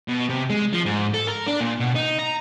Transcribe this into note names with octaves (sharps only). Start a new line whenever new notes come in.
B2
C3
G#3
F3
G#2
A4
A#4
D4
A#2
B2
D#4
A#5